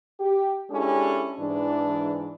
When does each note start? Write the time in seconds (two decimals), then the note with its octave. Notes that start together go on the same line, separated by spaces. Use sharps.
0.20 G4
0.71 G#3 C#4 D4 E4 G4 A4
1.40 G#2 E3 D4